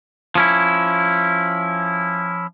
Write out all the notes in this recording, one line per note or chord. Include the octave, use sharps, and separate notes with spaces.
F3 C#4 E4